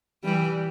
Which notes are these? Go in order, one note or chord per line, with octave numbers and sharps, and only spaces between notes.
E3 G3